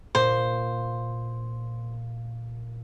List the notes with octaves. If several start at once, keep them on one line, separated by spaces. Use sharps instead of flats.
A#2 C5